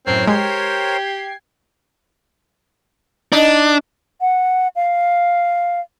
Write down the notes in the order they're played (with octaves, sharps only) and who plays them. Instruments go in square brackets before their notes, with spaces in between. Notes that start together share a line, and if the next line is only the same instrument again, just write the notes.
[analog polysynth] F#2 A2 [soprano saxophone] C4 [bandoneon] A#4 C5 C#5
[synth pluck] G#3 [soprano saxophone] G4 [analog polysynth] G5 G#6 C7
[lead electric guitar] D4 [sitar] D#4
[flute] F#5
F5